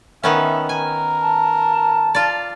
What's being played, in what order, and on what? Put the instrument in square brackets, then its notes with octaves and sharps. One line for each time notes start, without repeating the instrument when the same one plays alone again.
[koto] D#3 B3 C#4 [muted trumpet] E5
[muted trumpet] A#4 [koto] G#5
[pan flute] A5
[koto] F4 D5